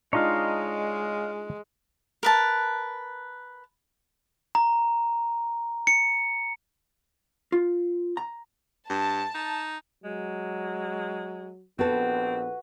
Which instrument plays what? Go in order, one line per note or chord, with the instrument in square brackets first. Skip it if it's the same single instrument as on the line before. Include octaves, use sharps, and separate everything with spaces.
[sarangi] G#3 [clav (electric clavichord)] D4 D#4 F4 [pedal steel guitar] C#5 D#5 F5
[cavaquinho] A#4 B4 A5
[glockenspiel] A#5
C#7
[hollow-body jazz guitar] F4
A#5
[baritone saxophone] G2 [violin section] A5
[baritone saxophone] D#4
[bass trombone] F#3 [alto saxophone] G#3
[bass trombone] A#1 [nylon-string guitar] B3 A4 [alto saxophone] C4 [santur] F#4 B4